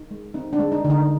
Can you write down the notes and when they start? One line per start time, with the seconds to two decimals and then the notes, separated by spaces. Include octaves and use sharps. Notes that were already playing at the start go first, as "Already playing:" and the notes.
Already playing: D#4
0.11 G#3
0.34 C4 D#4
0.53 D4
0.59 G#3
0.72 D#4
0.84 D3
0.90 D#4